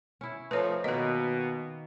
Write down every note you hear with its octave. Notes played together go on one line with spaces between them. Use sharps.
C#4 E4
F3 A3 D#4 B4 C#5 F5
B2 D#3 A#3 B4 D#5